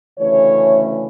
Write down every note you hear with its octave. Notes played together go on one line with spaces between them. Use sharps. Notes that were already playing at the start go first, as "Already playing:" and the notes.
D2 C#3 E3 A3 C#4 C#5